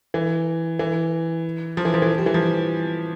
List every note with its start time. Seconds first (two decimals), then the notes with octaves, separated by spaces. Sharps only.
0.14 E3
0.79 E3
1.77 F3
1.85 E3
1.94 F3
2.02 E3
2.18 G3
2.26 E3
2.34 F3